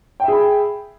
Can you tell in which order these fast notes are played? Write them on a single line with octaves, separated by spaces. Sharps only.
G5 E5 G#4 B5